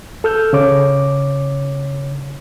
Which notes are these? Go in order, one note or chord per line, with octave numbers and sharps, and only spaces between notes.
A4 E6 F6 G6
C#3 C#5 D6